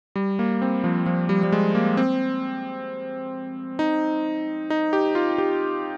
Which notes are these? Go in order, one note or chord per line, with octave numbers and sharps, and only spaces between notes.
G3
A#3
C4
F3
F3
G3
G3
G#3
A#3
C4
D#4
D#4
G4
F4
G4